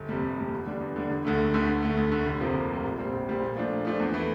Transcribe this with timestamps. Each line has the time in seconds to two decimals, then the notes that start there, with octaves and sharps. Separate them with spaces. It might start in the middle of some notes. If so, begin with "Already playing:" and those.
Already playing: G1
0.09 F2 C3 G3
0.23 G1
0.37 F2 C3 G3
0.53 E2
0.67 D3 G3 D4
0.81 E2
0.96 D3 G3 D4
1.09 E1
1.25 D2 D3 A3
1.38 E1
1.54 D2 D3 A3
1.67 D2
1.82 D3 A3
1.97 D2
2.12 D3 A3
2.26 F1
2.40 F2 C3 F3 A#3
2.55 F1
2.70 F2 C3 F3 A#3
2.84 A#1
2.98 A#2 G3 C4
3.13 A#1
3.28 A#2 G3 C4
3.42 A#2
3.57 F3 A3 D4
3.70 A#2
3.85 F3 A3 D4
4.00 E2
4.13 E3 A3 E4